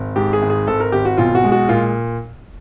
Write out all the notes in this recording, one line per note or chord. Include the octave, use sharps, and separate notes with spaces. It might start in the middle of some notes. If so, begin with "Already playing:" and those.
Already playing: G#1
G#2 G4
G#4
G#1
G#4
G#1 A4
A#4
G#1 G4
F#4
B1 F4
F#4
G#3
F#4
A#2 F4